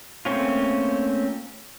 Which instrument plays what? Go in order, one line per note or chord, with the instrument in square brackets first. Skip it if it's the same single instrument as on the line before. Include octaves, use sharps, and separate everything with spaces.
[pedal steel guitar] A3 A#3 C4 C#4 F4